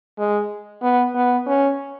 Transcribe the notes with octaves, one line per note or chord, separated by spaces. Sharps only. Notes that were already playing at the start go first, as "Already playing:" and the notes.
G#3
B3
B3
C#4